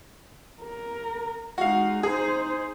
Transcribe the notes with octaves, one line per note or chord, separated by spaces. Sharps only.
A#4
G#3 D#4 F#4 F5
D#4 G#4 C5